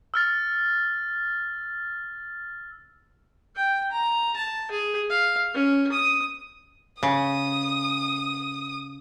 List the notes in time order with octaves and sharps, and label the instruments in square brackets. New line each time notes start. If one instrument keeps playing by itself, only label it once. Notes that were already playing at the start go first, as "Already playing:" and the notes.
[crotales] E6 F6 A6
[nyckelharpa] G5
A#5
A5
G#4
F5
C#4
D#6
[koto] C#3 [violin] D#6